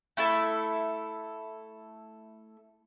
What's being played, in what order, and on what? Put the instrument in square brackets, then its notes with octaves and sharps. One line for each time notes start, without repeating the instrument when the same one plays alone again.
[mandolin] A3 E4 A4 A5